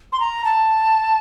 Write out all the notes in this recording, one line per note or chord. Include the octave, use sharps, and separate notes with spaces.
C6
A#5
A5